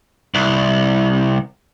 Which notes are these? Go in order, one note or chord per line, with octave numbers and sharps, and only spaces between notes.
C2